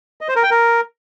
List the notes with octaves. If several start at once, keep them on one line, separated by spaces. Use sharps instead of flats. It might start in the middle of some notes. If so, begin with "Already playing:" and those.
D#5
C5
A#4
G5
A#4